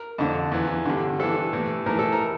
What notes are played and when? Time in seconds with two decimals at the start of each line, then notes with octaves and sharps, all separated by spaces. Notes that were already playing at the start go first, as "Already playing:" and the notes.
Already playing: A#4
0.18 F2 D3
0.52 E2 E3
0.86 G2 D3
1.19 G2 E3 A4
1.53 A2 E3
1.86 A2 E3 A#4
1.99 A4
2.12 A#4